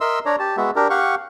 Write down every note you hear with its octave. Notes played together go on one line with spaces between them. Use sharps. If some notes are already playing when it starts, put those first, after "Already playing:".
A#4 D#5 E5 C6 E6
D4 C#5 D5 A#5
G4 A5
G#3 B3 F#4 E5
D4 G4 A#4
G4 F5 F#5 C#6